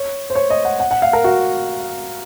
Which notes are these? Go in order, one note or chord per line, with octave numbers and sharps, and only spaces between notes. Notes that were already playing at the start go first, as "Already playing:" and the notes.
Already playing: C#5
C5
C#5
D#5
F#5
F#5
F#5
F5
A#4
F#4